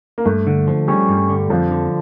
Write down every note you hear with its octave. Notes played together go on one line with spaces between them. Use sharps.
A#3
G2 A3
D3
F3
G3 C#4
G2
D3
F2 F3
D3